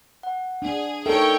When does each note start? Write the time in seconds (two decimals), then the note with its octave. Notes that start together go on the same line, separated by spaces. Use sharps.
0.23 F#5
0.62 D4 G#4
1.06 D#4 A4 A#4 C#5 E5 G5 C#6